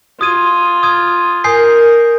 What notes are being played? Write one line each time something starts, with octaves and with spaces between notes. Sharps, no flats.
F4 D#6 G#6 D#7
D#6 G#6 D#7
A#4 G#5 D#6 G6 C7